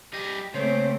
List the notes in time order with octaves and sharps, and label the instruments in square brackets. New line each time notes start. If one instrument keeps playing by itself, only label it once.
[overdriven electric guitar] G3 D#5 [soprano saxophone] G4
[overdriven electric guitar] C#3 [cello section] A3 A#3 C4 [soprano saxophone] C5 [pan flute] C#5